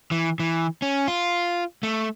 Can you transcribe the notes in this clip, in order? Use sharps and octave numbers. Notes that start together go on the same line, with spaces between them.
E3
E3
C#4
F4
A3